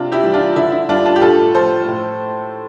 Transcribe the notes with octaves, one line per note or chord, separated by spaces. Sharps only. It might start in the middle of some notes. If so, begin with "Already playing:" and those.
Already playing: C3 D4 F4
E4 G4
E3 G3
D4 F4
D3 E4
E4
G3 D4 F4
D4 F4
G4
A2 F4 A4
F3 A3 A4 C5
A2